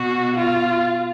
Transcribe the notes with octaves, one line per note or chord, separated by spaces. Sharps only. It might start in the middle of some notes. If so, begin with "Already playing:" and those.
Already playing: B2 F#4
F4